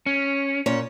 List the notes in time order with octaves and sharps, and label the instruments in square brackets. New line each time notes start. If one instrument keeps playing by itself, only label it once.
[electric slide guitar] C#4
[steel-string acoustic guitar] A#2 C#4 C#5